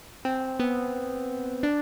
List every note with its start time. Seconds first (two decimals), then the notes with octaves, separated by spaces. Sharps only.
0.25 C4
0.59 B3
1.63 D4